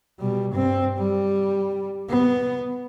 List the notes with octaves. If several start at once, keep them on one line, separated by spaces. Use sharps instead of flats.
B2 G3
G2 C4
G3
B3